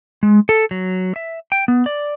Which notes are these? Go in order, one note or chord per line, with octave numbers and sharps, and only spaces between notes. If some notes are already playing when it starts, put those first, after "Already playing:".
G#3
A4
F#3
E5
G5
B3
D5